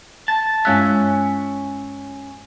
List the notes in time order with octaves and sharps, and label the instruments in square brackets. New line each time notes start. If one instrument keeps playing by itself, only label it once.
[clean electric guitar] A5
[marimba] G2 G#3 F#6 [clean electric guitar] C#4 E5